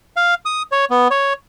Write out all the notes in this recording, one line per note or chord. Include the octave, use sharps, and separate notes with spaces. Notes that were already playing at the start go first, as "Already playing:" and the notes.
F5
D#6
C#5
B3
C#5